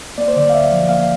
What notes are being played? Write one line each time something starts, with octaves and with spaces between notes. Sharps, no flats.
A#3 D5
C5
D3 D5
F5
D2 E5
F3
A#3 F5